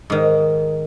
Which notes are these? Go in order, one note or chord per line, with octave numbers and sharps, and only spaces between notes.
G#2 D#3